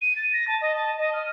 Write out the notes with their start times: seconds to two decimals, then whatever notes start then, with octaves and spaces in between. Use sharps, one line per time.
0.01 D#7
0.16 A6
0.32 A#6
0.47 A5
0.61 D#5
0.75 A5
0.98 D#5
1.13 F6